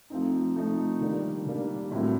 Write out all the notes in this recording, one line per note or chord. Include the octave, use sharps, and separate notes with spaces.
F3 A3 C4 D#4
F3 A3 C4 D#4
D#3 G3 A#3 D4
D#3 G3 A#3 D4
A2 F#3 A3 C4 E4